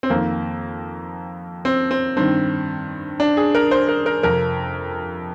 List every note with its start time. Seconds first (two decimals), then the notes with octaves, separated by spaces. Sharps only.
0.03 C4
0.10 F2 D#3 A#3
1.65 C4
1.91 C4
2.17 G2 D#3 C4
3.20 D4
3.37 G#4
3.55 A#4
3.71 C5
3.89 A#4
4.06 A#4
4.23 F2 C3 F3 A#4